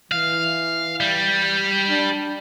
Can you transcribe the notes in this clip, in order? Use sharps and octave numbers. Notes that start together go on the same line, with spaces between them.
E3 F5
G3
D4